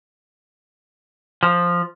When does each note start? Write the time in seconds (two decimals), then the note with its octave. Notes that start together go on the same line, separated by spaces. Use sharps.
1.43 F3